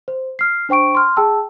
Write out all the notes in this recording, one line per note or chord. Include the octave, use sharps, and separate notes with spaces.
C5
F6 C7
D4 C5 G5 C#6 D7
C6 F6
G#4 G5 A5 E6